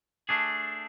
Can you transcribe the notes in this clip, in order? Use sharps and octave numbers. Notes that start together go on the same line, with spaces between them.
A3 D4 G#4